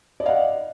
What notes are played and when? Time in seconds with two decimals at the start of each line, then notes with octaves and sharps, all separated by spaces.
0.20 D5
0.23 D#5
0.26 F5
0.29 F#5